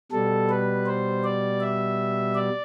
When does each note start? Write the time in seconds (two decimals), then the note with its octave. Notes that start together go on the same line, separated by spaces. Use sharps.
0.12 B2 G3 A4
0.49 B4
0.86 C5
1.24 D5
1.61 E5
2.35 D5